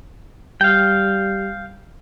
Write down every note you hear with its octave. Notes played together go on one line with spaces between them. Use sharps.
G3 F5 G5